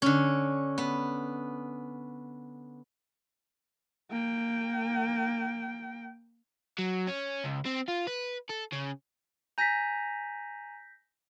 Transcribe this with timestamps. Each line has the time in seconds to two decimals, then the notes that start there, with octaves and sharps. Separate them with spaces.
0.02 D3 C#4
0.78 B3
4.12 A#3 G5
6.79 F#3
7.08 C#4
7.45 C#2
7.66 C4
7.88 F4
8.07 B4
8.50 A4
8.73 C#3
9.58 G#5 A#5 G6 A#6 B6